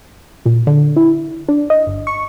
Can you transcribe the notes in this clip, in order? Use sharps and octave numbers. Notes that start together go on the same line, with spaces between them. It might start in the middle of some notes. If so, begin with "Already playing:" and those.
A#2
D3
E4
D4
D#5
G1
C#6